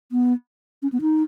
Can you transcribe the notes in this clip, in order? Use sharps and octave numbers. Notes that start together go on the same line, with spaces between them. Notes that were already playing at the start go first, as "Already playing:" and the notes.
B3
C#4
B3
D#4